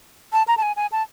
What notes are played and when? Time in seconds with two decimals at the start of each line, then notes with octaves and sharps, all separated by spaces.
0.33 A5
0.48 A#5
0.57 A5
0.62 G#5
0.76 G#5
0.92 A5